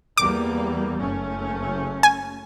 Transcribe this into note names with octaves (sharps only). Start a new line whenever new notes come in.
E2 G3 A#3 D6
F#1 A3 C#4
G#5